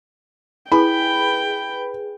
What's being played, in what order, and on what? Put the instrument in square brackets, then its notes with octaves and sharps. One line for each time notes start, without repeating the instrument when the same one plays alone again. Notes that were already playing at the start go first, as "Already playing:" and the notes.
[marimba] E4 [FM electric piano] G#4 B4 [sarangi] G5 [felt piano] B5